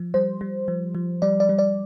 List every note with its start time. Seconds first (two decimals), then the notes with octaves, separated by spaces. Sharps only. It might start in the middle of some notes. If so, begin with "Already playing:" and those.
Already playing: F3
0.14 G3 C5
0.41 G3
0.68 F3
0.95 F3
1.22 G3 D5
1.40 D5
1.49 G3
1.59 D5